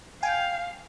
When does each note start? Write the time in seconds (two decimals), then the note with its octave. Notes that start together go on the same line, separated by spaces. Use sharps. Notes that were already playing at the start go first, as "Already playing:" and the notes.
0.23 F5 G5 G#5